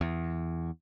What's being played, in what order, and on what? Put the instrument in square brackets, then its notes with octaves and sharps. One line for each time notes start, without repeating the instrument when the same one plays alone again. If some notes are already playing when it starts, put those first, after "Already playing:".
[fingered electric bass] E2